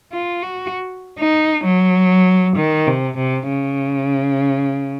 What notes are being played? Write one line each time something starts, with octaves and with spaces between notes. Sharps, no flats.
F4
F#4
D#4
F#3
D#3
C3
C3
C#3